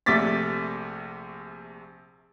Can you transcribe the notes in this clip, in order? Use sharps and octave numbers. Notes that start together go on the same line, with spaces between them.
A#1 C3 A3 D6 A6 B6